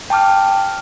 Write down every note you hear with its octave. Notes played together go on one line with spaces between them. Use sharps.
G5 A5 D6 F6